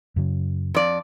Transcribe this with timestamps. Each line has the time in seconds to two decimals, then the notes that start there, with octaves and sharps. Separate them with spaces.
0.16 F#2 C#3 F#3
0.74 F2 D5